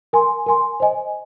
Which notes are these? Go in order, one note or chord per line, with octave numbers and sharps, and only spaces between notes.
A#4 G#5 C6
A#4 G#5 C6
C5 D#5 G#5